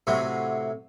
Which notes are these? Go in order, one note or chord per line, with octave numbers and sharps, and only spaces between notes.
A2 C3 F#3